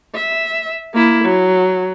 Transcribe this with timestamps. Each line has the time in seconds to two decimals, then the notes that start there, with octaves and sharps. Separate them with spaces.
0.15 E5
0.94 A#3 E4
1.24 F#3